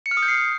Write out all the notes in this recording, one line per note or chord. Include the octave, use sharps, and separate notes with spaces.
C#7
F6
D#6
G6
C7